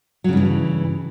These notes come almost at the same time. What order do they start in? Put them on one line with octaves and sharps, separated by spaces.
F#3 C#3 G2 E3